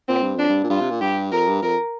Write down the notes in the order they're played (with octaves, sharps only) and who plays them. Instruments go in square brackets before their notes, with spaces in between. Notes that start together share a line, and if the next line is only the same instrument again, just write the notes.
[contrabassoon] A#2 [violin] C4
[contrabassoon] G2
[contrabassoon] F2 [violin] D4
[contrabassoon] G2
A#2
[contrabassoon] G2 [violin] F4
[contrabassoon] C3
A#2
[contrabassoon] G2 [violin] G4
[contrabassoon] F2 [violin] A#4
[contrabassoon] G2
[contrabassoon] F2 [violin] A#4